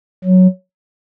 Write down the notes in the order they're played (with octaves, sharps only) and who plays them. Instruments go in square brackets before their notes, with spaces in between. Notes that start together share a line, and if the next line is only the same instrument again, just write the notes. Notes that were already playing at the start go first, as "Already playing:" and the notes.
[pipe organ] F#3